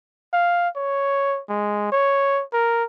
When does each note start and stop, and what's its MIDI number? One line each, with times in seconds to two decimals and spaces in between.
0.33 0.69 77
0.76 1.41 73
1.49 1.88 56
1.92 2.43 73
2.53 2.84 70